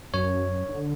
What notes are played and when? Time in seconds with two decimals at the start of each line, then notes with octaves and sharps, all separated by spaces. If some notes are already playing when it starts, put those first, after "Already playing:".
0.14 F#2 C#5
0.69 D3